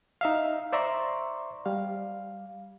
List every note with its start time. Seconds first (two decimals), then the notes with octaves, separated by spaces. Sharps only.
0.21 D#4 E5 F5
0.72 C5 D5 E5 A#5 C6 C#6
1.66 G3 F5